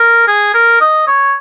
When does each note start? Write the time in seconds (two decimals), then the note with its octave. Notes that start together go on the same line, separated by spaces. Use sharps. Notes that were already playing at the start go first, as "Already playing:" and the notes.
Already playing: A#4
0.28 G#4
0.54 A#4
0.80 D#5
1.07 C#5